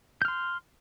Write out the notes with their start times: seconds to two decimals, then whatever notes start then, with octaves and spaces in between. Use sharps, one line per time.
0.22 G6
0.25 F6
0.28 C6